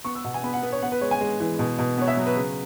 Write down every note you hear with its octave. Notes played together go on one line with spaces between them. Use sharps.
B3 C#6
E6
B2 F#5
G#5
B3 B5
F#5
B3 B4
C#5
B3 F#5
B4
G#3 C#5
G#5
G#3
E3
B2
B2
B3 C#5
E5
F#3
B4
C#3